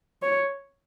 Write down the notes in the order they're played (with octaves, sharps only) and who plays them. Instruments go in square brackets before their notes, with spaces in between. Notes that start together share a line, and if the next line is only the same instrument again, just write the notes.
[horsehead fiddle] C#5